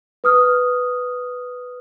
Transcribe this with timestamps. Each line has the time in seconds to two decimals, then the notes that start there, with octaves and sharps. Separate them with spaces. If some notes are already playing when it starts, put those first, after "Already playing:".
0.24 B4 D#6 F6